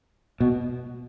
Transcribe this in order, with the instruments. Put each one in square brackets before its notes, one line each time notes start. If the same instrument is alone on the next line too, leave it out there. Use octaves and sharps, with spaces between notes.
[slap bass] B2